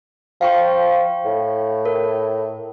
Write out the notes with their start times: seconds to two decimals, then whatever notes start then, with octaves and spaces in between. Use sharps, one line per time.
0.41 F3 F5 G5 C#6
1.25 A2
1.85 A#4